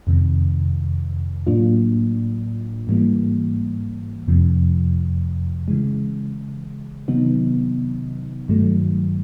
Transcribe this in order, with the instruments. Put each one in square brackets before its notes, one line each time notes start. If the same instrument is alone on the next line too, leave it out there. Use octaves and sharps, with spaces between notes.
[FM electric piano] F2 C3 D#3
A2 F#3 A#3 D4 F4
G#2 E3 G3 A#3
F2 C3 F3
C#3 E3 G#3
C3 D#3 F#3 B3 D#4
G2 D#3 F#3 A3